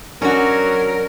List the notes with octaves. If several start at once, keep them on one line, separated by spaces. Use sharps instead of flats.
F#3 C#4 D4 F#4 A#4